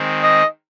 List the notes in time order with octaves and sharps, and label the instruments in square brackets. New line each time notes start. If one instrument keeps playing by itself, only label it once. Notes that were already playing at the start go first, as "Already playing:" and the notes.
Already playing: [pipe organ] D#3 G#3 C4
[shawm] D#5